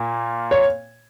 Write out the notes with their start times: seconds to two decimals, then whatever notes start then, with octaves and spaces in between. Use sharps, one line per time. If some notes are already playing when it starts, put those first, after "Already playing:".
Already playing: A#2 A#3
0.51 C#5